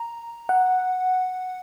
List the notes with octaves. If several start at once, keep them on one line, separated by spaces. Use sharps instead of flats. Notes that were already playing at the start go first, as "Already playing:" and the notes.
Already playing: A#5
F#5